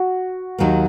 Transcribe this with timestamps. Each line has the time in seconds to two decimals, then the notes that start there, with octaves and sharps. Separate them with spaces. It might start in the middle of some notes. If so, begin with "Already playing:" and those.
Already playing: F#4
0.58 D#2 D#3 F#3 A#3